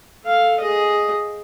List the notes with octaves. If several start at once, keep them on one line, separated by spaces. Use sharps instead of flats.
A4 F5
G#4 D#5